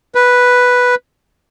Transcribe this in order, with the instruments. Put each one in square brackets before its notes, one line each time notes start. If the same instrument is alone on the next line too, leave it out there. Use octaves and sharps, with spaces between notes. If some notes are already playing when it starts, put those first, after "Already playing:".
[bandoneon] B4